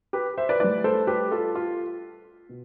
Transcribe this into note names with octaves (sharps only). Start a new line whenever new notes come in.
G4 B4
C5 E5
B4 D5
A2 G3 B4 D5
A4 C5
G4 B4
F4 A4
F4
B2